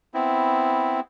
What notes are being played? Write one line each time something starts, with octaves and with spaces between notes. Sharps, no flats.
B3 C4 E4